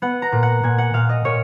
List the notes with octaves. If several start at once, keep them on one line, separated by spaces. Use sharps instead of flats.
B3 F#5
A#5
A#2
F#5
A#2 G#5
F#5
A#2 F5
D#5
A#2 C#5